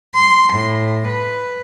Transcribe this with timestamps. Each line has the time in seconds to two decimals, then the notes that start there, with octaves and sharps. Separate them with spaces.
0.14 C6
0.54 A2
1.08 B4